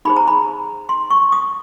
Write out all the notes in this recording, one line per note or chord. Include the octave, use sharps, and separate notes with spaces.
D#4 G#4 C5 B5
A#5
B5
C6
C#6
D#6